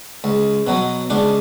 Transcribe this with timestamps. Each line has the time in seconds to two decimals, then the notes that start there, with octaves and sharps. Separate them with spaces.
0.24 C#2
0.67 B2 F#3
1.10 C#2 D4